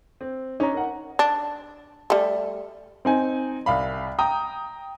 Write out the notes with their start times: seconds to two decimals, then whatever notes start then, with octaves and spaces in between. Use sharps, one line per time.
0.21 C4
0.60 C#4 D#4 C#5 A#5
0.74 A#4 F#5
1.19 D4
2.10 G3 A3
3.05 C4 D#4 G#5
3.66 C2 F5 B5
4.19 G5 A#5 D#6